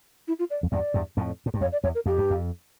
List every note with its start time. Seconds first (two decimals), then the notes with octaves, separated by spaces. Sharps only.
0.28 E4
0.39 F4
0.50 D5
0.63 F2
0.72 E2 G2 D5
0.94 E2 G2
1.17 F2 A2
1.46 A2
1.54 G2
1.61 F2 C#5
1.72 D5
1.83 E2 C#5
1.95 A#4
2.06 F2 G4
2.18 G2
2.30 F2